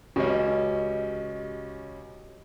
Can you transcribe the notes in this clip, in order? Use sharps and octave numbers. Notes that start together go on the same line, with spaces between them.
C#2 C#4 F#4 G4 D#5